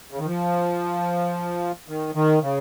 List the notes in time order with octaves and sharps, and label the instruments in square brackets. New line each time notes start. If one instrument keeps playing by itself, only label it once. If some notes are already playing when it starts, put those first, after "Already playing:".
[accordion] C#3
D#3
F3
D#3
D#3
C#3